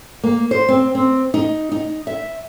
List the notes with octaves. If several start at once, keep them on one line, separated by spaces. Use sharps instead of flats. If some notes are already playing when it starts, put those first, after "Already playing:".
A#3
C5
C4
C4
D#4
D#4
E5